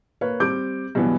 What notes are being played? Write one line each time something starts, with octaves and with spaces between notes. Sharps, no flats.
A#3 B4 C#5 F5
G3 C4 D6 G6 D7
G2 B2 E3 F#3 B3